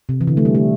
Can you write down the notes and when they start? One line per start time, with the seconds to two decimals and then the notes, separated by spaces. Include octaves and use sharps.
0.09 C3
0.21 E3
0.27 D3
0.37 A3
0.45 G3
0.55 A3